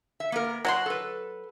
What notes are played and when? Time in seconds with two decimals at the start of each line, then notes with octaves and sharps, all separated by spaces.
0.20 E5
0.32 A#3 B3 A#4
0.65 F#3 F#5 A5 C6
0.86 A4 B4